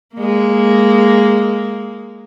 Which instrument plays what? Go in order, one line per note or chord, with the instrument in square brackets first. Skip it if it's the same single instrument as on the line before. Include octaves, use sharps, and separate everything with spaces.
[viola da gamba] G#3 A#3